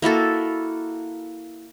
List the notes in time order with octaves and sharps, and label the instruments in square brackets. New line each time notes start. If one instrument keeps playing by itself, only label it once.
[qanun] A#3 E4 F#4 A4